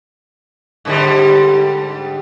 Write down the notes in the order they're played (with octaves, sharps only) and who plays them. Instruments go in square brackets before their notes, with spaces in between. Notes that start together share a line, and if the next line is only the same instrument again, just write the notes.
[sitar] G#2 D3 G3